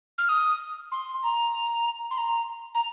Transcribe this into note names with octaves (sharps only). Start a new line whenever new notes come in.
F6
D#6
C6
A#5
C6
A#5
A#5